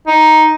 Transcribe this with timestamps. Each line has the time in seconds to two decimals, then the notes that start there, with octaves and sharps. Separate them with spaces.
0.07 D#4